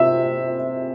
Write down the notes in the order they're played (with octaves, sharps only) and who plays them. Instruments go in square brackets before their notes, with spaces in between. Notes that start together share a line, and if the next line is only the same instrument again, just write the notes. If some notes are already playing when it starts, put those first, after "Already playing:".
Already playing: [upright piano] C3 E5